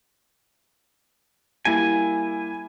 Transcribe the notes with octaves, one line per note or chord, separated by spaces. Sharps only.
G3 A#3 E4 G#5